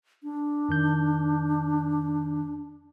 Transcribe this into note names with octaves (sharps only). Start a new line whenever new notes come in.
D4
F2 D#3 G6